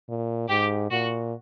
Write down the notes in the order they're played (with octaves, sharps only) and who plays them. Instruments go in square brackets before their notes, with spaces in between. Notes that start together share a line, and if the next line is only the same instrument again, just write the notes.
[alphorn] A#2
[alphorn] G#2 [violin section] G4
[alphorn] A#2 [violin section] F#4